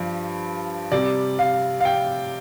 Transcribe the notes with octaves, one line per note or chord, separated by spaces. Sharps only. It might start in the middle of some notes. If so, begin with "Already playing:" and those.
Already playing: G2 F3
C3 G3 D5
F5
F5
G5